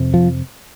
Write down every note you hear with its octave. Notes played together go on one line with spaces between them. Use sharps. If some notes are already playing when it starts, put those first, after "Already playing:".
Already playing: F2 C3
F3